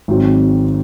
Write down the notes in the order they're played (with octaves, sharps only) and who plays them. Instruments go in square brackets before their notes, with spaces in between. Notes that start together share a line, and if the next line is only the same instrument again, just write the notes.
[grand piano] G#1 G#2 F#3 C4